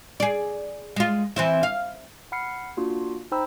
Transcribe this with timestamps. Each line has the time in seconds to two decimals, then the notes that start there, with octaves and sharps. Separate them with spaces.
0.20 G#4 D5
0.96 G#3 F4
1.36 E3 C4 E4
1.63 F5
2.32 F#5 B5 F6 C7 C#7
2.77 A#3 D4 F4 F#4
3.32 D#4 C5 G5 A#5 B5 E6